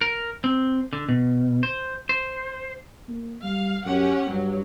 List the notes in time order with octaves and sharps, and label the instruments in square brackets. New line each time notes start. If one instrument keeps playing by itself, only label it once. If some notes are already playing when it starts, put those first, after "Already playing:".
[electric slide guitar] A#4
C4
D3
B2
C5
C5
[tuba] A#3
[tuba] G3 [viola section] F5
[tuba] F#2 [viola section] C#4 G4 F#5
[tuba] G2 [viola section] F#3